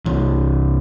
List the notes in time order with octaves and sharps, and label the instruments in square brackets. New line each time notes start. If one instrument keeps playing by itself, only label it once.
[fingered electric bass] C2 E3